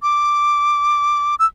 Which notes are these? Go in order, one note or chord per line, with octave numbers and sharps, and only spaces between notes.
D6
E6